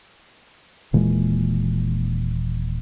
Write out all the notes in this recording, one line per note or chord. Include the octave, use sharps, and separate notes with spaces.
D#1 A#2 E3 G#3